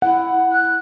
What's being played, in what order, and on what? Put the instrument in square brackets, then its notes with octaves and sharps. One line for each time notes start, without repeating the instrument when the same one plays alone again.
[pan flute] E4 [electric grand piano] F#5
[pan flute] F#6